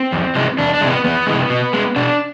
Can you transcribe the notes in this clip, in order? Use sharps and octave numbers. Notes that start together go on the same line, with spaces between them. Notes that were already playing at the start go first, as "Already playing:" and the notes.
Already playing: C4
E2
C3 E3 G#3
E2 D4
D4
C3 E3 G#3
B3
E2 B3
C3 E3 G#3
B2
G#3
B2 D4